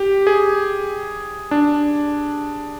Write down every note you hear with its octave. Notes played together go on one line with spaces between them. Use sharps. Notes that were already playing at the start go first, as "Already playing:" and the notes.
Already playing: G4
G#4
D4